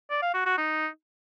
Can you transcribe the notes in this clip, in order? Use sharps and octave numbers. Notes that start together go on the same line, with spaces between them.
D5
F5
F#4
F#4
D#4